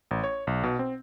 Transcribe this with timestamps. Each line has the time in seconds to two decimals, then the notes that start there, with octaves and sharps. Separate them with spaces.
0.11 A1
0.24 C#5
0.47 B1
0.64 B2
0.79 C4